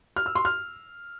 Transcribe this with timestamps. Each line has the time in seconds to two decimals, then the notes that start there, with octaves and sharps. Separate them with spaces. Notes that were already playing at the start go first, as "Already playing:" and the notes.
0.16 F6
0.26 E6
0.35 C6
0.45 F6